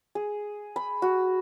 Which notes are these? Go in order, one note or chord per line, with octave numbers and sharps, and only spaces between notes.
G#4
B5
F#4